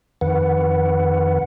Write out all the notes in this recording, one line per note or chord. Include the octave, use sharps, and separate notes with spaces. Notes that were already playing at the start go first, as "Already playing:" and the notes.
F2 D#3 B4 F#5